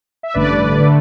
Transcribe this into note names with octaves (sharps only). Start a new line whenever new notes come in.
E5
A1 G2 D3 A3 B4 D5
D3 A3